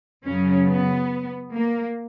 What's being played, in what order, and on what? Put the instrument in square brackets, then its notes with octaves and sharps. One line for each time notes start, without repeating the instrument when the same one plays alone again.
[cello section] F#2 C#3 F#3 C#4
B3
A#3